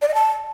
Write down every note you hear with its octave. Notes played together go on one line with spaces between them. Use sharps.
D5
D#5
A5